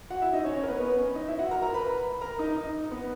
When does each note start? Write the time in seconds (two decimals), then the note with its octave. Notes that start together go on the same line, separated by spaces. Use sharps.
0.10 F#4 F#5
0.21 E4 E5
0.33 D#4 D#5
0.45 C#4 C#5
0.56 C#4 C#5
0.63 A#4
0.68 B3 B4
0.80 B3 B4
0.98 C#4 C#5
1.15 D#4 D#5
1.27 E4 E5
1.39 F#4 F#5
1.51 A#4 A#5
1.62 A#4 A#5
1.74 B4 B5
2.21 A#4 A#5
2.39 D#4 D#5
2.56 D#4 D#5
2.91 B3 B4